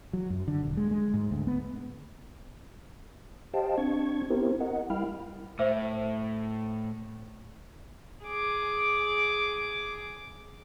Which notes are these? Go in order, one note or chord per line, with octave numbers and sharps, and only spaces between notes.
F#3
F#2
D3
D#1
G#3
G#3
G#2
D2
B3
G4 C5 D#5 F5 G5 A5
C4 D4 C#6 G#6
B3 C4 E4 G4 A#4 C5
A#4 D#5 F#5
G3 E4 F5 G5 B5 F6
A2 C5 E5 E6
G#4 D6